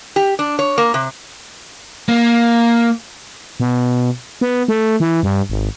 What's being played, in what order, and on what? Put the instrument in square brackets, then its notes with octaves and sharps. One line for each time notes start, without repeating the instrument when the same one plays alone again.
[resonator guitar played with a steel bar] G4
D4
C#5
A#3
C3
[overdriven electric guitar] A#3
[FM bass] B2
B3
A3
E3
G2
G#1